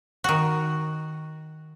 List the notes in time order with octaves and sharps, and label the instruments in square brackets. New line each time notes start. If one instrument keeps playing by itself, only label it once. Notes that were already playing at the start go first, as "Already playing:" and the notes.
[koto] D#3 F#4